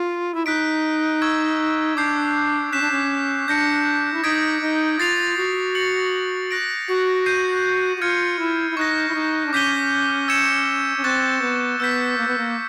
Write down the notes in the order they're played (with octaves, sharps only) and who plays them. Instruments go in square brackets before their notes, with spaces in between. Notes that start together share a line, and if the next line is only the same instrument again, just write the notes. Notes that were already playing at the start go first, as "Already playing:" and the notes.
Already playing: [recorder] F4
E4
[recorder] D#4 [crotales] F#6 B6 D7
[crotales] C#6 E6 G#6
[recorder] D4 [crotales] D6 G6 C7
[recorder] C#4 [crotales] F#6 B6 E7
[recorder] D4
C#4
[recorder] D4 [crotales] G6 A#6 C#7
[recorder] E4
[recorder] D#4 [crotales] D#6 G#6 B6 D7
[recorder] D#4
[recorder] F4 [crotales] A6 C7 F7
[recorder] F#4
[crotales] A6 C#7 F#7
F#6 A#6 D7
[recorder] F#4
[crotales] G6 C7 D#7
[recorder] F#4
[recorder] F4 [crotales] F6 G#6 C#7
[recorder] E4
E4
[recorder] D#4 [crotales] C#6 F#6 A#6
[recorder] E4
D#4
D4
[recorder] C#4 [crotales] D6 G6 B6 D#7 G7
[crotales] E6 G#6 C#7 E7
[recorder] C#4
[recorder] C4 [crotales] C#6 F#6 A6
[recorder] B3
[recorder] B3 [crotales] E6 G6 B6
[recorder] A#3
B3
A#3